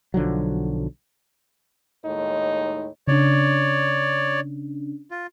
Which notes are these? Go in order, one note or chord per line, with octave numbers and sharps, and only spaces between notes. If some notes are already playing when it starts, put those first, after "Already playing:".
B1 D3 F3 F#3
D#2 A2 G#3 D#4 C#5
C#3 C#4 D4 C#5 D5
F4